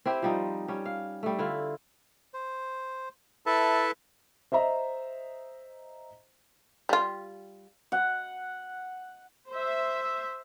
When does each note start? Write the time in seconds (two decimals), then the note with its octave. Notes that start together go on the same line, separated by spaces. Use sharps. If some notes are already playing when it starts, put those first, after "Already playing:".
0.05 C4 E4 G4 C5
0.22 F3 G3 D#4
0.68 G3 C#4
0.86 F5
1.23 G3 A3
1.39 D3 E4 F4
2.34 C5
3.46 E4 A4 B4 E5 A5
4.52 C5 D#5 E5 A#5
6.89 G3 F4
7.92 F#5
9.50 C5 E5